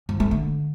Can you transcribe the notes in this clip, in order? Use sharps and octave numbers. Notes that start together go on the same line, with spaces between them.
F3
A3
D3